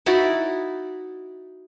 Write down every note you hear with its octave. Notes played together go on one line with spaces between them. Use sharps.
D#4 E4 F#4 D5